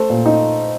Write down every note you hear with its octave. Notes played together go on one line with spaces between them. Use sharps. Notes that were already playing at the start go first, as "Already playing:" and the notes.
Already playing: A3 A4 C5
A#2
D#4